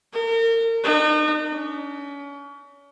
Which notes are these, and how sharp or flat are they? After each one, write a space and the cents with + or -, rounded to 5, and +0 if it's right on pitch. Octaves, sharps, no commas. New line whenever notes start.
A#4 -35
D#4 -40
C#4 +35